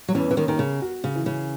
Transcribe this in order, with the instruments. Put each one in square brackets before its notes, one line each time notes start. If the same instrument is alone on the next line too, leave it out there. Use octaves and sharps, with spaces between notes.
[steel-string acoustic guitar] F#3
[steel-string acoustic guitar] E2 E3 [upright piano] C#4
[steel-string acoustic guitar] E3
D#2 D#3
[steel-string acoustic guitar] D#3 [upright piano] A#4
[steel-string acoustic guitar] C#3
[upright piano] F#4
[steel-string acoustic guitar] C#3
[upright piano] E3
[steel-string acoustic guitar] C#3